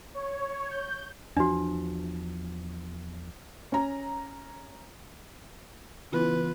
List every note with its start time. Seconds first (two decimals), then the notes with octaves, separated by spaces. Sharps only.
0.14 C#5
0.71 G6
1.37 E2 F3 D4 F#4
3.72 C#4 A#5
6.12 C#3 E3 B3 F4 B4